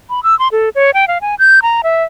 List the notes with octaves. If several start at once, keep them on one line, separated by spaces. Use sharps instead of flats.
B5
E6
C6
A4
C#5
G5
F5
G#5
G6
A#5
E5